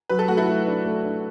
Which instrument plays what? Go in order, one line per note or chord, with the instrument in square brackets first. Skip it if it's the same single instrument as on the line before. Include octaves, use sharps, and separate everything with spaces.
[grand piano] F#3 [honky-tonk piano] B4
[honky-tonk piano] A4
[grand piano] A3 [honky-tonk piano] F#4
[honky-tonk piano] E4 A4
[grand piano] A3
D4
A3
D4